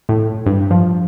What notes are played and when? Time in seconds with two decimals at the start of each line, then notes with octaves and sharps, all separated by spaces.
0.09 A2
0.46 G2
0.71 F3